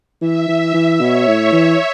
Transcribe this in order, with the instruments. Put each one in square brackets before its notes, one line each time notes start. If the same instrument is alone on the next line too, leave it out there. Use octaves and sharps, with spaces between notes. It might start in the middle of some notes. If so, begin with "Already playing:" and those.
[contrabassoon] E3 [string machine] E5
[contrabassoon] E3
E3
[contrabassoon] B2 [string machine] C#5
[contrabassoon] A2
E3